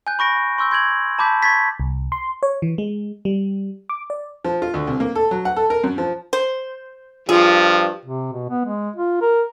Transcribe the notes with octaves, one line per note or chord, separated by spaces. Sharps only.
G#5 F#6 G6
B5 C#6 A#6 D7
C6 C#6 E6 G6
C6 G6 G#6 D7 F#7
A5 B5 D6 G6 B6
B5 C#6 D6 G#6 A6 B6
C2
C6
C#5
E3
G#3
G3
D6
D5
F3
F4
D2
C2
A#3
A4
F#3
F#5
A4
A#4
F#2
F3
C5
G2 F3 F4 G#4
C3
B2
B3
G#3
F4
A#4